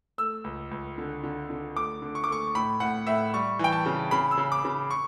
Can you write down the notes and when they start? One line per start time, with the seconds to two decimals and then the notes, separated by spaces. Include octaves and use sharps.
0.18 A3 E6
0.44 C#2
0.71 C#2
0.98 D3
1.24 D3
1.50 D3
1.76 A3 D6
2.02 D3
2.15 C#6
2.24 D6
2.28 A3 C#6
2.55 A2 B5
2.80 A2 F#5
3.07 A2 E5
3.34 G3 C#6
3.59 E3 G5
3.73 A5
3.86 C#3
4.11 C#3 B5
4.31 E6
4.37 C#3
4.52 D6
4.65 C#3
4.91 C#6